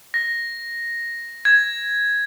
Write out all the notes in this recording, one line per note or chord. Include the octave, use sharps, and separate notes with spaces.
A#6
G#6